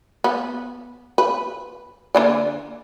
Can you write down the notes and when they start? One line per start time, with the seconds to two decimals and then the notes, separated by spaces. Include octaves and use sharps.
0.24 B3
1.18 B4
2.15 D3 A#3 D5